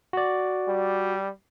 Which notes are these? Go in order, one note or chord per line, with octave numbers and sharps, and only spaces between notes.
F#4 D5
G3